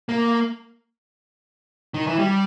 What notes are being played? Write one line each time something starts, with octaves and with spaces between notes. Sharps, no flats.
A#3
D#3
E3
G3